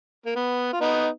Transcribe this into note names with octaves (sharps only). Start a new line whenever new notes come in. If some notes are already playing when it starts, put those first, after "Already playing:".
A#3
B3
F4
B3 D#4